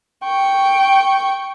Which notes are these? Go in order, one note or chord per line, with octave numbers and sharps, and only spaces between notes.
G5 C#6